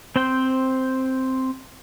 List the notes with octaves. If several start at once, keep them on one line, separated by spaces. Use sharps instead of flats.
C4 C5 G5